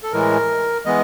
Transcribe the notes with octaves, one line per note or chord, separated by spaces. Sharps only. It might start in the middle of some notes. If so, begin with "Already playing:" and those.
A4
A2 E3 G#3 A#4
E3 G#3 B3 D#5